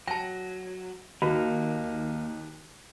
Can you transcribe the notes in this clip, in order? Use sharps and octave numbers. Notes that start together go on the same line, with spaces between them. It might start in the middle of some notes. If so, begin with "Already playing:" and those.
F#3 G5 A5 A#6
D#2 A#3 D#4 F#4